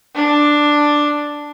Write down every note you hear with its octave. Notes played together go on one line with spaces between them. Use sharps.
D4